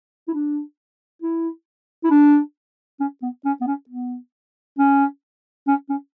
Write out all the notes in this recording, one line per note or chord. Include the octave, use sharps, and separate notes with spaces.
E4
D4
E4
E4
D4
C#4
B3
C#4
B3
C#4
B3
C#4
C#4
C#4